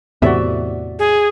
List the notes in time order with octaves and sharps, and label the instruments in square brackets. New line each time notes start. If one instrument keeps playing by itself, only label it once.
[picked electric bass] E2 A2 C3 [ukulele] F#4 D5 E5
[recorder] G#4